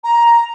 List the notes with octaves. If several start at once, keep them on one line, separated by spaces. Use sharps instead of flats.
A#5